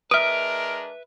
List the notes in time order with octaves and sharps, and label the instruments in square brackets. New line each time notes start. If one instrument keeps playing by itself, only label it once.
[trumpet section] G#3 D4 A#4 [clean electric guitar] B4 E5 [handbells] D#6 F6 [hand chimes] D7